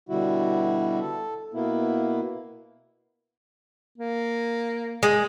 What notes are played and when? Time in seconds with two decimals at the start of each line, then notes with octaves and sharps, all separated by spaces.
0.09 B2 D3 G3 E4 F#4
1.01 A4
1.54 B2 A#3 B3 E4
3.98 A#3
5.03 G#3